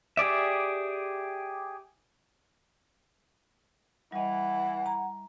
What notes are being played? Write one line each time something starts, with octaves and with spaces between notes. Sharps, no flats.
G4 G#4 D5 E5
E3 G3 D#5 F#5
A#5